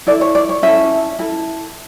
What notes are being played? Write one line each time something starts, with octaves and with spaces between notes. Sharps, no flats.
E4 A4 D5
C#5
D5
C#5
C#4 E4 A4 E5
E4 A4